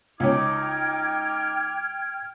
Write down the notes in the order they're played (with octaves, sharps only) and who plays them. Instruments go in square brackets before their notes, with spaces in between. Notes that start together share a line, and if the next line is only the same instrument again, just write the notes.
[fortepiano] C#2 C#4 [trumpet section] D#4 D6 [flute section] G5 F6 G#6